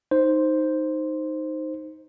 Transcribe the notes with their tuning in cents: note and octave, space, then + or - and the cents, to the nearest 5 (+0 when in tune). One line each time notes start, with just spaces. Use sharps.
D#4 +0 C5 +0